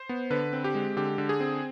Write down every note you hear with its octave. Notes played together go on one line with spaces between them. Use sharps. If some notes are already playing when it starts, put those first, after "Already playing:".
Already playing: C5
B3
D3 B4
C4
G4
G#3
D3 G4
D3
G#4
C4